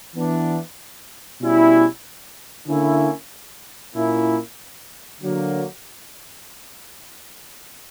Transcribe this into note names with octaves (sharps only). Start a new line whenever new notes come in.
E3 B3 D4
B2 G3 C#4 E4
D3 A#3 C#4 E4
A#2 A#3 C#4 E4
D3 F#3 A#3